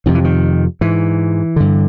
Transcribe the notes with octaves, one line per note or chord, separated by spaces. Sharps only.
F2 C3 D#3
E3
D#3
G#2 E3
G2 D3